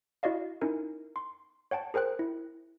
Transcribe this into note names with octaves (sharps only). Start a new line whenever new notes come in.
E4 F#4 D5 D#5 F5
C#4 D#4 E4 A#4
C6
C#5 F#5 G5 A5
G#4 A#4 C5 G5 F#6
E4